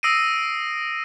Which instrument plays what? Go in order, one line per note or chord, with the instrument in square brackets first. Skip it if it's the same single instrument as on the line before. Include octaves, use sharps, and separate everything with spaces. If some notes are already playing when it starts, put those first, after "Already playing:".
[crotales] D#6 E6 A#6 C7 D7 D#7